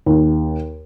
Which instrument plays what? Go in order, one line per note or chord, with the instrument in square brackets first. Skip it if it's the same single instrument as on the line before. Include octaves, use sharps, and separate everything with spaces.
[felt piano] D#2